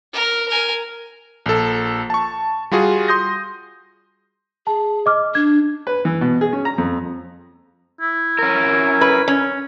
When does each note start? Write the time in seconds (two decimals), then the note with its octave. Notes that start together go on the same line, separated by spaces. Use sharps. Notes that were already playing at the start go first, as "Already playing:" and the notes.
0.13 A#4
0.48 A#4 G#5
1.46 A#1 A4
2.10 A5 C#6
2.71 G3 F4 F#4 G#4
3.08 C6 D#6 G6 A#6
4.67 G#4 A5
5.06 D#5 D6 F6
5.35 D4 G#6
5.87 B4
6.05 E3
6.21 B2
6.41 G#4
6.53 C#4
6.65 A#5
6.78 F2
8.01 E4
8.39 C#4 A#4
9.01 B4
9.28 C#4